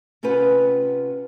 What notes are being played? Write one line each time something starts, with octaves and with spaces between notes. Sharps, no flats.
C3 C#4 F4 G4 B4 F#5